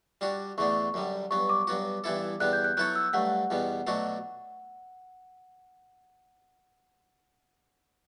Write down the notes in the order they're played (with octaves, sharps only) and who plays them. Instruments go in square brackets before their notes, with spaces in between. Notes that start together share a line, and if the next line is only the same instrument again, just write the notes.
[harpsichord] G3 D4 F#4
[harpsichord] E2 D3 A3 D4 [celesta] C#6
[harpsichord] F#2 D3 G3
[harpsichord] G2 F#3 B3 [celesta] C#6
[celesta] D6
[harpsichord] G2 F#3 B3 F#4
G2 E3 B3 E4 A4
[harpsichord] E2 D3 G3 B3 [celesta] F#6
[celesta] G6
F#6
[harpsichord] F#3 B3 E4 A4 C#5 [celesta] F#6
[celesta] E6
[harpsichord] G2 F#3 A3 [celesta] F#5
[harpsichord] E2 B2 G3 B3
B2 F#3 A3 D4 F#4